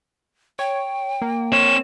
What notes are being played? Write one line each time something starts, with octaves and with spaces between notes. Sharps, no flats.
C#5 G5
A#3
C4 C#5 E7